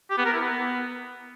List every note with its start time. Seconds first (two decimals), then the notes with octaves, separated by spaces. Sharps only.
0.10 G4
0.18 B3
0.26 A#4
0.33 E4
0.41 B3